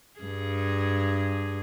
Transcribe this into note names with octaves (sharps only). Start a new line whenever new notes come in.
G2 G#4